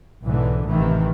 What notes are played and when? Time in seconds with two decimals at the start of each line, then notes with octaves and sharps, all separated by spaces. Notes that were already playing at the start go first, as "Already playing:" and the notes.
0.23 B1 G#2 D3 E3
0.69 A1 C3 D#3 E3